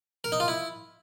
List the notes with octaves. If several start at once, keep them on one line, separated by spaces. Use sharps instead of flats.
A#4
D#4
F4
E4